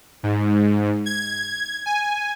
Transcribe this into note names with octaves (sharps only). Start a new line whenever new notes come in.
G#2
G#6
G#5